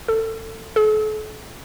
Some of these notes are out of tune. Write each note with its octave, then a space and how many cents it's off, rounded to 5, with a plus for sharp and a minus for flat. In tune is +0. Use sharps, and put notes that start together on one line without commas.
A4 +20
A4 -40